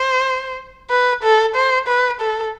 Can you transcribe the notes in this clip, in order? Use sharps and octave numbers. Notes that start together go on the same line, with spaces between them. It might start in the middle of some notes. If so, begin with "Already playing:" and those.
Already playing: C5
B4
A4
C5
B4
A4